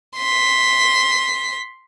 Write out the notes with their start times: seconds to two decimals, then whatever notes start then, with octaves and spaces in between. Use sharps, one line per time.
0.17 C6 B6